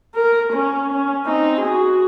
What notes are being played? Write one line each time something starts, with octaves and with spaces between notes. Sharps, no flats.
A#4
C#4
C#4
C4 D#4
F#4 G#4